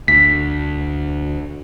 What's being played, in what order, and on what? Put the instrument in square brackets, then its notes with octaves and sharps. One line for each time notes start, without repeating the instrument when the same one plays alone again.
[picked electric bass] D2 [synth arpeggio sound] B6